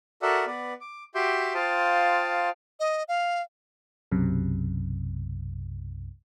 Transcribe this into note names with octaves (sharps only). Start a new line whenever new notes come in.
F#4 A4 A#4 D5 E5 F#5
B3 B4 D5
D6
F#4 G4 E5 C6 D6 G6
F4 C5 F5 G5 A5 D#6
D#5
F5
B1 F#2 C3